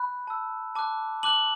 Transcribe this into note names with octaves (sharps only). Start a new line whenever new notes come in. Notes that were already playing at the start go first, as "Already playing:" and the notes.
Already playing: B5 F#6
A5 E6
A5 D6 F#6
A5 D6 F#6 F#7